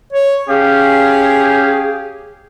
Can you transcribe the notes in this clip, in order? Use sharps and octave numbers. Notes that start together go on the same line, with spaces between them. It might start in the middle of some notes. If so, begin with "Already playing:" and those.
C#5
C#4 G4 G#4 F5